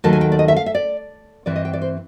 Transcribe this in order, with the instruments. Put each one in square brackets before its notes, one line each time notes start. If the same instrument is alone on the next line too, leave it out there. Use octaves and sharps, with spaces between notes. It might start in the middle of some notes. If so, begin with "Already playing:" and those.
[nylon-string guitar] D#2 D#3 F#3 A3 A5
G#5
G5
D5
D#5
E5
F5
E5
D5
G2 E3 G3 C4 D5
D#5
G5
D5
C5